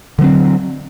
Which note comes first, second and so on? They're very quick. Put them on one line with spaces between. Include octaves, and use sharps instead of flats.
D3 F#3 C4